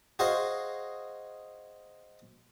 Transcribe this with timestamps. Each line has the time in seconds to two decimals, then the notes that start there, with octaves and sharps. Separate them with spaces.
0.19 F#4 G#4 C5 D#5 F5